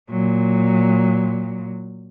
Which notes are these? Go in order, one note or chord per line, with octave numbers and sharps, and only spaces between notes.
A#2 F#3